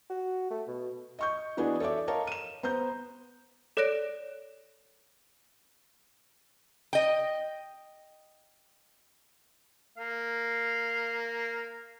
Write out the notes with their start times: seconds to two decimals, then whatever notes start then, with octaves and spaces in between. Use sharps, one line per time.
0.10 F#4
0.50 A3
0.67 B2
1.19 D#5 C#6 G6
1.57 E3 B3 D4 F#4 G#4 D#5
1.80 A4 C#5 D5 E5 D6
2.07 A#4 C#5 D#5 F5 A5 A#5
2.27 D#7 E7
2.63 B3 C5 A#5 G6
3.77 A4 C#5 D5 F#6 A#6 D7
6.93 D#5 G5
9.98 A#3 F5